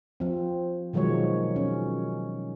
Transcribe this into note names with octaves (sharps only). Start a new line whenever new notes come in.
F3 C4
B2 D#3 F3 F#3 G#3 C#5
C#4